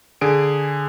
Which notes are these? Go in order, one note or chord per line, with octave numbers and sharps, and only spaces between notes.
D3 G#4 D7